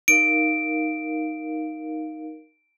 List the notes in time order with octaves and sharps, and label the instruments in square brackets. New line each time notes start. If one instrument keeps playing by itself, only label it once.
[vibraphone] D#4 A#4 F5 [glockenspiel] D7